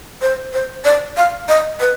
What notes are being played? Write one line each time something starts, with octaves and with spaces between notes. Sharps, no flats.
C5
C5
D5
F5
D#5
B4